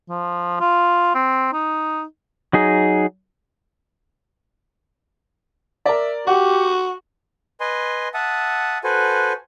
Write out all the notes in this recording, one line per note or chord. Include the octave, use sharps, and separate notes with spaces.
F3
F4
C4
D#4
F#3 D#4 G#4
A#4 D5 E5
F#4 G4 F#5
B4 D#5 G#5 C6
E5 F#5 A5 D#6
F#4 A4 B4 C5 G#5